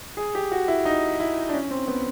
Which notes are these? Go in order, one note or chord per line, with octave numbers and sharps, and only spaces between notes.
G#4
G4
F#4
E4
D#4
E4
D4
C#4
C4
B3